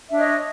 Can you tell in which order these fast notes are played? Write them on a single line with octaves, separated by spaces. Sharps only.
E5 D4 C#5 D#5